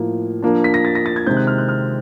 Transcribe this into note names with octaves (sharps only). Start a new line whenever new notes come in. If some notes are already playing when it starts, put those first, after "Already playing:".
Already playing: A2 F3 A#3
F3 A#3 D4
B6
A#6
A6
A#6
A6
G#6
C3 D#3 G#3 C4 G6
F#6
F6
F#6
F6